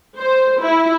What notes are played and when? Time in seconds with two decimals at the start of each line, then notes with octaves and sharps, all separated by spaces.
0.18 C5
0.61 E4